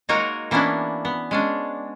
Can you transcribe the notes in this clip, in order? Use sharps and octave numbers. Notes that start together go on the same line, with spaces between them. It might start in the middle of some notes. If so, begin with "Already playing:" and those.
G#3 A#3 D#4 F#4 A#4 C#5
E3 A#3 B3 C#4 D4 E4
B3
G#3 C#4 D4